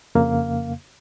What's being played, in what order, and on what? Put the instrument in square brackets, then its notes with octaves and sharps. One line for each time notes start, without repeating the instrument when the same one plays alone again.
[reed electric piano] F2 C#3 A#3 F5